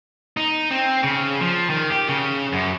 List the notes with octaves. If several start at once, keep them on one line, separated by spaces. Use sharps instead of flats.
D#4
C4
C#3
F3
D#3
G4
C#3
F#2